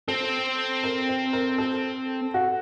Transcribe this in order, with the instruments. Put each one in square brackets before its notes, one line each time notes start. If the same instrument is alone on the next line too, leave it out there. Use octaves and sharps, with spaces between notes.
[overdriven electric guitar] C4 [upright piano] A4
[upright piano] A#4
C5
A#4
A4
F#4